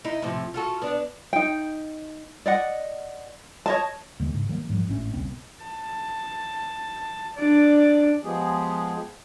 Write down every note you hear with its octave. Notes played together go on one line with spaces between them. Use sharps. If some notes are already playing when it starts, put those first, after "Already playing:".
D#4 E4
A2 C3 F3
F4 F#4 A4
B3 D4
D#4 G5
D5 D#5 F#5
C#5 D#5 A5
D#2 D3 G#3
G#2 C#3
D#3 F#3 A#3
G#2 F3 F#3
G#1 A2 C#4
D#1 B1 C#3 C4
A5
D4 D5
F3 G#3 B3 G4 G#4